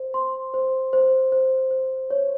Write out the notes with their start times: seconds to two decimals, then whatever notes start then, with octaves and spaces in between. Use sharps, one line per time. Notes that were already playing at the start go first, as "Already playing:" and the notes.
Already playing: C5
0.14 C6
0.54 C5
0.93 C5
1.32 C5
1.71 C5
2.10 C#5